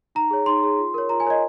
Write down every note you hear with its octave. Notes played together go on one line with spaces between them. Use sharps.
D#4 A#5
G#4 C#5
D#4 C6
G#4 C#5
F4
A#4 C#5
F4 A#5
G#5
A#4 C#5 D#5